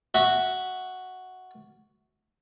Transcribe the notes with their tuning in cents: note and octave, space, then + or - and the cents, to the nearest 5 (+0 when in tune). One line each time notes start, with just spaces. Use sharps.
F#4 +0 E5 -25